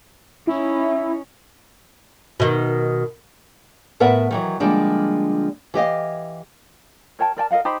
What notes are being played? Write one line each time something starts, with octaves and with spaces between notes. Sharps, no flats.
C#4 D#4 E4
B2 D#3
A2 B3 A#4 B4 E5 F#5
D#3 E3 F#3
D3 F3 G3 G#3 A#3 D4
E3 G4 D#5 F5
A#4 C#5 G5 A5
A#4 D5 G5 A5
A#4 D#5 F5 F#5
D#4 G4 C5 B5